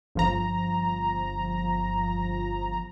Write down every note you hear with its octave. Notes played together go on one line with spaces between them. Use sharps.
G1 F3 A#5